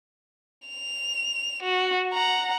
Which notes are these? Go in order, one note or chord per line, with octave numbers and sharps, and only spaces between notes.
F7
F#4
F#5 A#5